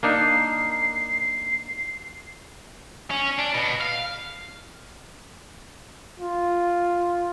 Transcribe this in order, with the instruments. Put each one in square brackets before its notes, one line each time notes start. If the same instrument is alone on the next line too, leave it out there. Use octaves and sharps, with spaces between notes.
[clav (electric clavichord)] A#3 D4 D#4 [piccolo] C7
[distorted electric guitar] C#4
D4
B2
F5
[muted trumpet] F4